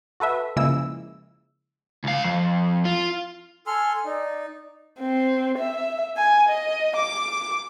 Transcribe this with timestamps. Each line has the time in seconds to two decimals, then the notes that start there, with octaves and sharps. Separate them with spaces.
0.20 F#4 A4 B4 E5
0.56 C#3 F3 G#3 A#3 E4 E6
2.04 C#2 F5
2.25 F2
2.85 F4
3.67 A4 G#5 C6 F6
4.05 D#4 D5
5.00 C4
5.58 E5
6.17 G#5
6.48 D#5
6.96 D6